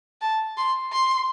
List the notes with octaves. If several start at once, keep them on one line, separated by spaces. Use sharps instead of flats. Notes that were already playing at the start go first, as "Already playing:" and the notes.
A5
C6
C6